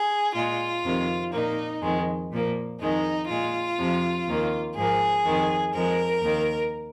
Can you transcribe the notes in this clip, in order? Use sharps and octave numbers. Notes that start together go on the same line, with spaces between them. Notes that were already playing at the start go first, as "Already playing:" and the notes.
Already playing: G#4
A#2 G#3 F4
F2 C3 D#3
A#2 A#3 D#4
F2 D#3 G#3
A#2 F3 A#3
F2 D#3 G#3 D#4
A#2 G#3 F4
F2 C3 F3
D#2 D#3 A#3
G#2 F3 A#3 G#4
F2 D#3 G#3
F2 F3 G#3 A#4
D#2 D#3 A#3